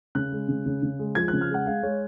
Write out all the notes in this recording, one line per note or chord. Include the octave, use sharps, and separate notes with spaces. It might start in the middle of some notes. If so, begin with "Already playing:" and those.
C#3 F#6
G#3
C#3
C#3
C#3
G#3
F3 G#6
F#6
C#3
F6
G#3 F#5
G#3 F5
G#3 C#5